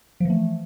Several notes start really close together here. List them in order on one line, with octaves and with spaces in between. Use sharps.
F3 E3 A3